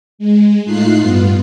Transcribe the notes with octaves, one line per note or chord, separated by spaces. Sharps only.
G#3
A2 A3 D#4 F4 F#6 C7
G2 B3 F4